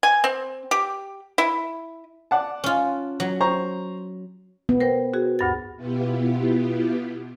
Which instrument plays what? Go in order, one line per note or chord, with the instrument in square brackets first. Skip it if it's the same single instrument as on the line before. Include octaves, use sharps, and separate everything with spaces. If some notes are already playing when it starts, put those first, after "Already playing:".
[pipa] G#5
C4
G4
E4
[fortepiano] D5 F#5 A5
[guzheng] C#4 F4
F#3
[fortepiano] C5 A#5 C#6
[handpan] B3
[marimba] A#4 C5 G5
F#4 G#4
D2 G2 A6
[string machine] B2 B3 E4 F4 G4